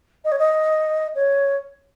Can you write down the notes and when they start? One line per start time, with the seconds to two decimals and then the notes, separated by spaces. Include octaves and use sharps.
0.25 D#5
0.32 C#5
0.39 D#5
1.15 C#5